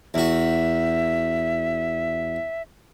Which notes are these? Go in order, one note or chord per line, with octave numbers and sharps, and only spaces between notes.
E2 F#4 E5